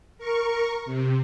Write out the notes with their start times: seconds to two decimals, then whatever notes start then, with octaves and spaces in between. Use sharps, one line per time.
0.18 A#4 C#6
0.85 C3